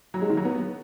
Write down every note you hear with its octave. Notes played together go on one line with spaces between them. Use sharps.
F#3
G#3
D#3
F#3
B3